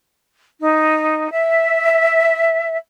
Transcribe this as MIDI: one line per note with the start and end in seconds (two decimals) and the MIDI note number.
0.60 1.28 63
1.31 2.76 76